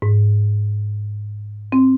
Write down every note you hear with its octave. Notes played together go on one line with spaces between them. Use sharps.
G#2
C4